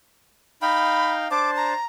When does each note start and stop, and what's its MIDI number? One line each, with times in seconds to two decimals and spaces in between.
0.62 1.28 63
0.62 1.28 77
0.62 1.28 79
0.62 1.13 83
1.31 1.74 62
1.31 1.74 72
1.31 1.74 81
1.31 1.51 86
1.56 1.87 82